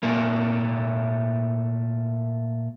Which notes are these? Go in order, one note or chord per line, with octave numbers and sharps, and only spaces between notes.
A#2 A3 A#3